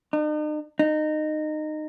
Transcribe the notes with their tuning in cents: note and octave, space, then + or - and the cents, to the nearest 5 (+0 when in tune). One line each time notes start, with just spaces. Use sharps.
D#4 -45
D#4 -20